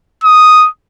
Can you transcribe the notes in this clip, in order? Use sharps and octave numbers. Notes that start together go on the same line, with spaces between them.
D#6